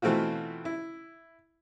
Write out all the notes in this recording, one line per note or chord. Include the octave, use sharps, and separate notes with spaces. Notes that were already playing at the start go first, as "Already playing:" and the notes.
B2 E3 A3 C4 F4 F#4
E4